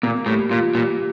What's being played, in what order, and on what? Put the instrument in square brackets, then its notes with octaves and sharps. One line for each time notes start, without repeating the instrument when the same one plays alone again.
[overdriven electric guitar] A#2 [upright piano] A#3
[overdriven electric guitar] A2 [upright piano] G3
[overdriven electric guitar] A#2 [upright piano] F4
[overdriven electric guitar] A#2 [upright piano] G3